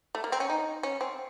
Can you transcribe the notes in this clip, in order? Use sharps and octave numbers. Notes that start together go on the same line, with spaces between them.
A3
A#3
C4
C#4
D#4
C#4
C4